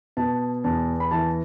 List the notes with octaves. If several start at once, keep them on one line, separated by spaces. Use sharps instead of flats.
B2 A5
E2 A5
B5
E3 A5